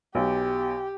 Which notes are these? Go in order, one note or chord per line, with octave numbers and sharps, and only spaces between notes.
B1 G4